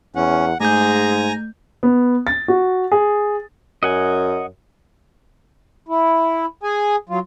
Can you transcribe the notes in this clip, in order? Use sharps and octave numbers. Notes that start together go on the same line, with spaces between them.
E2 C#4 F#5
G#2 A3 G#4 G#5 A#5 G6
B3
A6
F#4
G#4
F#2 D#5 F#5 G#5
E4
G#4 G#5
F#3 F4